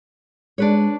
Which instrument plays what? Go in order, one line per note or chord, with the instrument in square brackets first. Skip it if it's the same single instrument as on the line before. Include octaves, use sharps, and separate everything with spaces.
[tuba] G#3 [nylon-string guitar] D4 B4 C#5